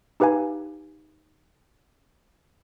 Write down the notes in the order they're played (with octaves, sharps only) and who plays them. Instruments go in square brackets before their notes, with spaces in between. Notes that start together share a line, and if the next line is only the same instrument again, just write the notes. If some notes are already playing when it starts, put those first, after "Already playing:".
[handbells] D#4 G4 B4 F5 G#5